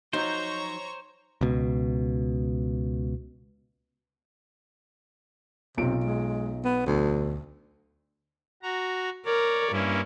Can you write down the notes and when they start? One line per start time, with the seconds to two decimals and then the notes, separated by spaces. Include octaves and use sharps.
0.13 F3 F#3 D#4 C5 C#5 A#5 C#6
1.41 C#2 B2
5.77 B1 C3 F4 D7
6.04 G#3
6.64 B3
6.86 D2
8.63 F#4 A#5
9.26 A#4 C#5 D5
9.72 G2 A#3 C#4 E4